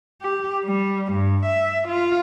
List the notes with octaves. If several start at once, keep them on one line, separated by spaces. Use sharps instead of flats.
G4
G3
G2
E5
F4